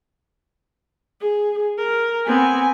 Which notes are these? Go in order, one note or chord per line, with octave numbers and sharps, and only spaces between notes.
G#4
A#4
B3 C4 G#5